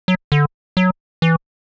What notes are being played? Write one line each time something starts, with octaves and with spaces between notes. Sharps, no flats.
F#3
D3
F#3
E3